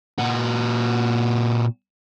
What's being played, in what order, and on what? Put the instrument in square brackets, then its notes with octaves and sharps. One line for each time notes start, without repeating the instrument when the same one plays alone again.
[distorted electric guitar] A#2 F#4